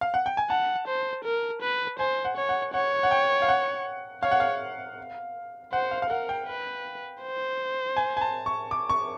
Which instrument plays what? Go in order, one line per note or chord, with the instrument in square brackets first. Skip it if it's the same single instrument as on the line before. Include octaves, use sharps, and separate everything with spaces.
[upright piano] F5
F#5
G5
G#5
[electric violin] F#5 [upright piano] A5
[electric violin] C5
A#4
B4
[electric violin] C5 [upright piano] G#5
[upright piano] F#5
[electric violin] C#5
[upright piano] F#5
[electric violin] C#5 [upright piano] F#5
[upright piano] F#5
G5
F5
F#5
[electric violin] C#5 [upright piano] F5
[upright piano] F#5
F5
[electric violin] C5 [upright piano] F#5
[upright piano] F5
F5
[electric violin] A#4 [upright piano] F#5
[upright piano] G5
[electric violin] B4
C5
[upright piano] G#5
G#5
A5
C#6
D6
C#6